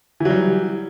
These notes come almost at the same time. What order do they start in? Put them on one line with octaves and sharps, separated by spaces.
E3 F#3 G3